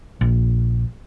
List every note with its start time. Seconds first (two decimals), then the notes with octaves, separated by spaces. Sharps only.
0.21 A#1